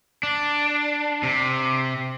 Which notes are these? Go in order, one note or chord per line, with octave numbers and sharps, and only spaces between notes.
D4
C3